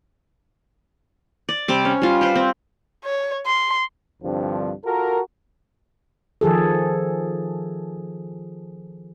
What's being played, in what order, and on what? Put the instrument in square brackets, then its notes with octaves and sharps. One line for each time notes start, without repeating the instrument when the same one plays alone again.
[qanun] D5
C3 G3 C4 D6
C#4
G3 F4
G4 B4 C5
C4
[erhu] C#5
C6
[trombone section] C2 G2 D3 F3 C4
F4 F#4 A4 A#4
[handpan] D#3 F3 G#4 A4